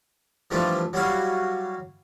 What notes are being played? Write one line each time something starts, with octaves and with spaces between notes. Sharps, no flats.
E3 F3 G3 A3 D4 F4
F#3 G3 E4 F#4 F5